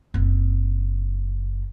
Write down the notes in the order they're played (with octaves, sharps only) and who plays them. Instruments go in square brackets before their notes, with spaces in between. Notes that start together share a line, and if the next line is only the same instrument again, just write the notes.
[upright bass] F#1 C4